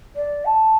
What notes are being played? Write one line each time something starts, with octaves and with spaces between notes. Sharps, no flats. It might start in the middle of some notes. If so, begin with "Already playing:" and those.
D5
A5